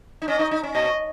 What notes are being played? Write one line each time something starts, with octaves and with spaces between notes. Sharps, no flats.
D#4
C#4 D#5
D#4
D#4
C#4
A#2 D#5